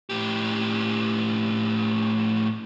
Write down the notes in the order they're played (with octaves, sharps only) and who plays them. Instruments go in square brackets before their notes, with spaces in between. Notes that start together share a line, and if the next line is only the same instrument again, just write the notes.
[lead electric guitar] A2 G4